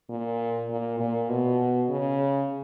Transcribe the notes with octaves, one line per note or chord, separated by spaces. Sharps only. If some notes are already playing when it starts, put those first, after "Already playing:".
A#2
A#2
A#2
B2
C#3